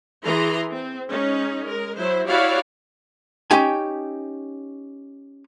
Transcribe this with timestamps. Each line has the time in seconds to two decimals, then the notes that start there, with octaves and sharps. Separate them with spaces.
0.24 E3 G#4 A#5 C6
0.72 C4
1.09 G#3 C#4 D#4
1.65 G#3 A#4
1.97 F#3 E4 C5
2.27 E4 F#4 G4 C#5 D5 F5
3.51 C#4 D#4 G4 G#5